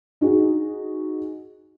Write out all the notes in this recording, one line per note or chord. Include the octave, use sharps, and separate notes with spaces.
D#4 F#4 G#4